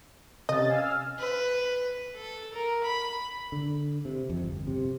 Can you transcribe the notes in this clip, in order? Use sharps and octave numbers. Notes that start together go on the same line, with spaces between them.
C3 C#4 D#5 A6
F5 G#5 E6
E6 F6
B4
A4
A#4
B5
D3
C3
F2
G1
C3